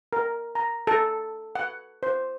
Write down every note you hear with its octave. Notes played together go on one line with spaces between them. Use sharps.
A#4
A#5
A4
F#5
C5